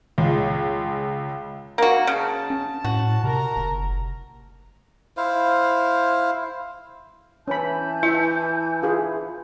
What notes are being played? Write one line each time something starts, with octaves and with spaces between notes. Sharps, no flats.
C#2 G#3
A#3 F#4
C#3 A5
C#4
A2 F#4
C3 A#4 A#5
F#1
E4 C5 F5
E3 C#4 G#5 A5 B5 G6
E4 E5
F4 G#4 B4